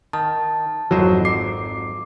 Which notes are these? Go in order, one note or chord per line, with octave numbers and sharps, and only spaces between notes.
D#3 A5
G#1 F2 F#3 C5
D6 C7